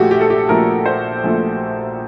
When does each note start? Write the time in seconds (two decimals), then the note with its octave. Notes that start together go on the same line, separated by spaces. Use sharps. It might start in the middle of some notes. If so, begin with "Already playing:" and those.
Already playing: A#1 A#2 A3 F#4 G4
0.11 G4
0.21 A4
0.30 G4
0.49 A#1 A#2 A3 A#4
0.86 C5
1.24 A#1 A#2 A3